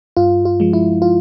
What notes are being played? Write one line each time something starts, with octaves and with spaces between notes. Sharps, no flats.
G2 F4
F4
F3 G#3
E4
F4